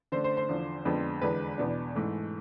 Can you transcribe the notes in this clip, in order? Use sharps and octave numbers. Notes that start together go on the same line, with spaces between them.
D3 A3 D4 C5
C5
C5
E2 D3 F3
F2 D3 G#3 B3 D4
E2 D3 G#3 D4 B4
E2 B2 B3 D4
G#2 E3 A3